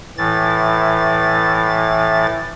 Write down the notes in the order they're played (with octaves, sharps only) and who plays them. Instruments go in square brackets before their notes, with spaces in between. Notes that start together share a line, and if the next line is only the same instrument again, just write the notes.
[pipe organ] A2 E3 A6